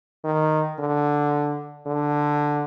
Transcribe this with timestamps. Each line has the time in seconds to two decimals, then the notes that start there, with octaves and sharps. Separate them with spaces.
0.24 D#3
0.79 D3
1.86 D3